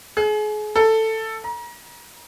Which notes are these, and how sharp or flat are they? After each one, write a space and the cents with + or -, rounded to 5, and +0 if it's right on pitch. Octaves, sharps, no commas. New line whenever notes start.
G#4 +35
A4 +10
A#5 +35